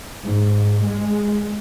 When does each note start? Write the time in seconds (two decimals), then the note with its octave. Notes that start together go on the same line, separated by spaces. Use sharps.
0.24 G#2
0.84 G#3